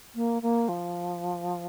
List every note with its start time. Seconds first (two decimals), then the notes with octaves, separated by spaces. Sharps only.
0.15 A#3
0.42 A#3
0.69 F3